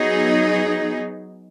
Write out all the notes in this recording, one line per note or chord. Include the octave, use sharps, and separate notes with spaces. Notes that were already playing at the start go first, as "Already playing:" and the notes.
Already playing: F#3 B3 D#4 G#4